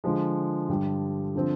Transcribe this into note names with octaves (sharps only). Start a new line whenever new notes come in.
D3 F3 G#3
G2 D3 G3
D3 F3 C4